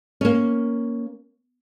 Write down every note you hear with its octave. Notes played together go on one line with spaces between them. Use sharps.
A#3 C#4